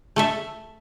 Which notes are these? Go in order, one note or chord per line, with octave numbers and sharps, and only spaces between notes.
A3 A4 E5